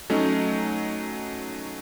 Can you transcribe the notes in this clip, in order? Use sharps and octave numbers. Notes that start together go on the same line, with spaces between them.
F#3 A3 C#4 D#4